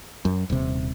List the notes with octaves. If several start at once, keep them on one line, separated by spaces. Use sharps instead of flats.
F#2
D#1 C3